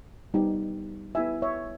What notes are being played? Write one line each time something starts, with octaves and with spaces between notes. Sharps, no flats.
G3 B3 D#4 G4
B3 E4 G4 E5 G#5
C#5 E5